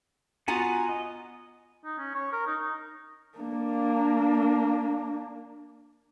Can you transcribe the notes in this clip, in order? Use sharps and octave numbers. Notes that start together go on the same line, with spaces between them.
B3 F4 F#4 F#5 G#5 A#5
D#5
D#4
C#4
C#5
A#4
D#4
D#4
A#3 D4